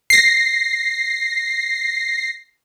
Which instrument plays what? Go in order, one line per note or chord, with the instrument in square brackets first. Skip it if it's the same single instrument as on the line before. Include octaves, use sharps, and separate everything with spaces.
[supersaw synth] A#6 C7